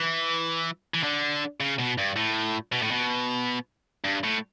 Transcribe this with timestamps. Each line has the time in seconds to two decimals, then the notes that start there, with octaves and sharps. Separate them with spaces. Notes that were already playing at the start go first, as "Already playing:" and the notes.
Already playing: E3
0.94 E3
1.03 D3
1.60 C#3
1.79 B2
1.98 G2
2.16 A2
2.72 B2
2.82 A2
2.91 B2
4.04 G2
4.23 A2